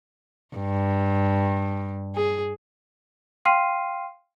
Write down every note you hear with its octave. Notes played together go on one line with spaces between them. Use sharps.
G2
G#4
F5 G5 C6 F6 C7 D#7